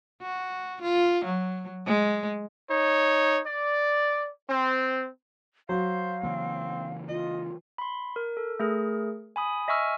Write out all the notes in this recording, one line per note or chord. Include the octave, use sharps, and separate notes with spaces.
F#4
F4
F#3
G#3
D#4 C#5
D5
C4
F#3 C5 F5
C#3 E3 A#3 C4
F4 D#5
B5 C6
A#4
A4
A3 G#4 A#4
G#5 B5 D#6
D#5 E5 G#5 C#6 E6 F6